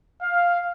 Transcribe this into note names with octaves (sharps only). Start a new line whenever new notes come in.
F5